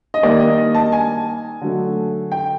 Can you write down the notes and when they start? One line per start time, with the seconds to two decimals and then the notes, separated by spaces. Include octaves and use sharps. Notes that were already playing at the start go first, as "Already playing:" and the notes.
0.14 D#5
0.23 D#3 G3 A#3 D5
0.40 D#5
0.58 D#5
0.74 A5
0.92 G#5
1.61 D3 F#3 A3
2.32 G5